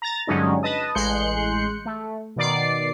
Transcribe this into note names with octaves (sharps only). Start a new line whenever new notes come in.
A#5 A6
G2 D3 F#3 G#3 C#4 D#4
B4 D#5 A5 D#6
A1 G#3 C6 F#6 G6 C#7
A3
B2 D#3 D5 D6 C7